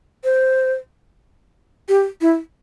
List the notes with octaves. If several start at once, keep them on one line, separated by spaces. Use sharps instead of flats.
C5
G4
E4